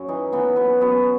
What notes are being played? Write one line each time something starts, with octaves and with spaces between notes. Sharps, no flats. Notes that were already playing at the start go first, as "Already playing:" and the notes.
Already playing: F#2
E3 D#4
E3 B3
F#2 B3
F#2 B3